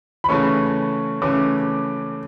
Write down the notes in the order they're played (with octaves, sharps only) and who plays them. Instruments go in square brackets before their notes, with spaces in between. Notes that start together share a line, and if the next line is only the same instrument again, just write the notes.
[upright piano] B5
[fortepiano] C#3 E3 A3 C#4 [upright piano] C#6
[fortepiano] C#3 E3 A3 C#4 [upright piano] D6